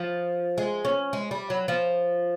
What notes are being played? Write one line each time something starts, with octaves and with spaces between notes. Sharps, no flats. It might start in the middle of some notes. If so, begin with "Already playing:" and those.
Already playing: F3
G#3
C#4
G#3
G3
F#3
F3